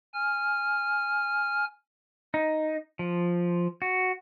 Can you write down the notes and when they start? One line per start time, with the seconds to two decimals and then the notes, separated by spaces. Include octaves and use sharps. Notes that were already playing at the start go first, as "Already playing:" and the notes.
0.14 G#5 F6
2.34 D#4
2.99 F3
3.82 F#4